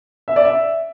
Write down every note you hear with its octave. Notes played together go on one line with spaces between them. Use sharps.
E5
D5
E5